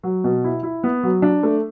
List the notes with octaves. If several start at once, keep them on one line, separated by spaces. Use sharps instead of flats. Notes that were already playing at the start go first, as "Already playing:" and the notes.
F#3
B2
E4
E4
B3
F#3
D4
A3